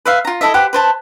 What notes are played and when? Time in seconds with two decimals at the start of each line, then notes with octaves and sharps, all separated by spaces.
0.06 B4 E5 F5
0.25 F4 A#5
0.41 E4 A4 D#5 E5
0.54 G4 B4 C5 F#5
0.73 B4 C5 A5